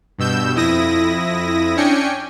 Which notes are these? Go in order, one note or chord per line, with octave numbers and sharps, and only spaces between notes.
G2 B2 E6 G6
F2 E4 D#6 A#6
C#4 D4 G5 G#5 C#7